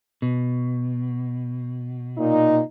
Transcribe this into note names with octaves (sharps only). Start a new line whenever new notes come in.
B2
A#2 D#4